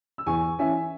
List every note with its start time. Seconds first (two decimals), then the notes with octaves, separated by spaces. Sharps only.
0.18 E6
0.26 E2 G#5 C#6
0.59 E3 C#4 E5 G#5